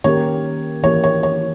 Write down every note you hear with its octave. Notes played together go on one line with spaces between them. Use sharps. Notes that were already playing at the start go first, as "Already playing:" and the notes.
D#3 A#3 C#4 G4 A#4 C#5
E3 A#3 E4 G4 C#5
C#5
C#5